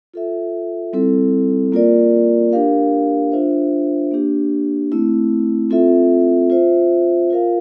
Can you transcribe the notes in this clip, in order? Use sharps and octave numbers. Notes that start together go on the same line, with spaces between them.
F4 A4 E5
G3 C4 E4 A4
A#3 F4 A#4 D5
D4 G4 A#4 F5
D4 F4 C5 E5
A#3 D4 G4
A3 C4 E4
C4 F4 A4 E5
F4 C5 E5
F4 A#4 F5